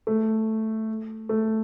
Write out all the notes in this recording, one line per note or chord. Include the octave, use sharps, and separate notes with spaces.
A3
A3